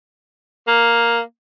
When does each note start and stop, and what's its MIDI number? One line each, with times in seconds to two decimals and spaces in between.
0.68 1.20 58